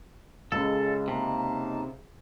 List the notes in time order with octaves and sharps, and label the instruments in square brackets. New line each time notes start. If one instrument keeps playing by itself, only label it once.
[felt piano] C#2 [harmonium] C#3 G#3 [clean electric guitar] A4
[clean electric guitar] C3 [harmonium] A#3 D#4 A5